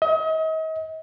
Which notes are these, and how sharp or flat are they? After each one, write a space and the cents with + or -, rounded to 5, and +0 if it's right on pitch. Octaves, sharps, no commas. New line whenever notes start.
D#5 +40